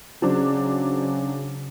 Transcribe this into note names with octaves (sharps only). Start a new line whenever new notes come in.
C#3 F#3 C4 D4